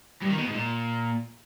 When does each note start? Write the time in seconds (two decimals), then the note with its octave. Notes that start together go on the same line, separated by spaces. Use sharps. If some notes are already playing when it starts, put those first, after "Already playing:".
0.22 G2
0.30 D#3
0.38 B2
0.46 G#2
0.55 A#2